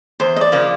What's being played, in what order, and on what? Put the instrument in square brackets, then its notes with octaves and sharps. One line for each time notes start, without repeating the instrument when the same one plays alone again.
[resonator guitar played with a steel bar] E2 [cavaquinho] C5
[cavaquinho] D#5
D5
[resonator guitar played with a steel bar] C#3 F3 A#3